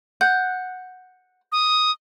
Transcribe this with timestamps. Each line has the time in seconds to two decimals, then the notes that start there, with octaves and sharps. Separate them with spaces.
0.21 F#5 G6
1.52 D#6